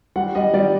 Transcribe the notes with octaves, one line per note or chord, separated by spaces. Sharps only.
G3 F#5
G3 D#5
G3 D5